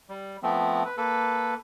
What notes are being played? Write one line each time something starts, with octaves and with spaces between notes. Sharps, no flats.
G3
F3 A3 B3 C4
B4
A#3 A4 B4